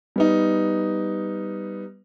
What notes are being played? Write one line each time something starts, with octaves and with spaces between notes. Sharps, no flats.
G3 B3 D#4